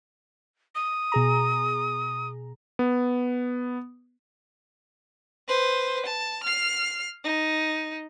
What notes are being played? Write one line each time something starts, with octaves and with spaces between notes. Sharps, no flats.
D#6
B2 G#4 A#5
B3
B4 C5
A5
F6 C7
D#4